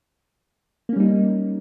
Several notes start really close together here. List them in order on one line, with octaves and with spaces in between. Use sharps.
A#3 C#4 G3 D#4